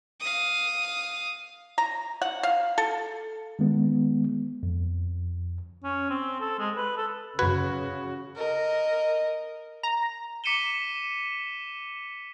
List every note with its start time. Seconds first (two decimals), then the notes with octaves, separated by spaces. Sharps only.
0.20 F5 D#6
1.78 A#5
2.22 F#5
2.43 F5
2.78 A4
3.59 D#3 G#3 B3
4.63 F2
5.84 C#4
6.10 C4
6.40 A4
6.59 G#3
6.77 B4
6.97 A4
7.39 F#2 C#3 F#4 B4 G#6
8.36 A#4 D#5
9.83 A#5
10.44 D6 B6 C#7 D#7 E7 G7